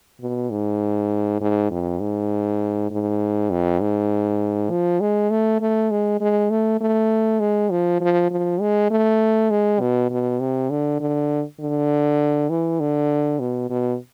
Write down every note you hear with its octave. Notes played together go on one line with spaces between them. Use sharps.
B2
G#2
G#2
F2
G#2
G#2
F2
G#2
F3
G#3
A3
A3
G#3
G#3
A3
A3
G#3
F3
F3
F3
G#3
A3
G#3
B2
B2
C3
D3
D3
D3
E3
D3
B2
B2